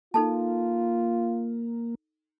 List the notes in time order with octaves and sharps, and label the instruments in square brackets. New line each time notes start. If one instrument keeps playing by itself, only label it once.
[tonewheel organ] A#3 [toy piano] D#4 A4 A5 [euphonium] F4